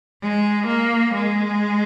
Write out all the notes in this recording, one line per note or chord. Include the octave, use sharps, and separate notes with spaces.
G#3
A#3
G#3